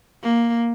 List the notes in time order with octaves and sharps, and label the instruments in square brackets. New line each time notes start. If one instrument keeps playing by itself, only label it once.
[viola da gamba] A#3